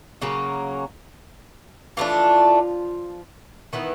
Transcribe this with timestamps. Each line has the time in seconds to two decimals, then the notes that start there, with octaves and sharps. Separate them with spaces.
0.22 C#3 F#3 A#3 C#4
1.97 E3 F3 A3 D4 F4
3.73 D#3 E3 B3 E4